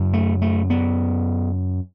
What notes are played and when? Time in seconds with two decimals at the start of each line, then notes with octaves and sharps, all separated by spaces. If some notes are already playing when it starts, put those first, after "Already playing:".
Already playing: F#2 C#3
0.13 A3
0.42 A3
0.70 B3